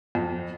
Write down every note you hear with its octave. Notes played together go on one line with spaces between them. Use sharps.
F2